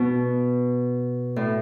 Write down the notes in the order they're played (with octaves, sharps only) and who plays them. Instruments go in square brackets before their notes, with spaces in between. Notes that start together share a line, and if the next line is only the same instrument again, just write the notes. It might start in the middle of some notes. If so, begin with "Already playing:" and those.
Already playing: [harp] B2
A2